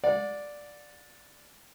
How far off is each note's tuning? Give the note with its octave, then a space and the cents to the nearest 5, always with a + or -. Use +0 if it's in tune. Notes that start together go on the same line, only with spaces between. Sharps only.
D5 +0 F#5 -35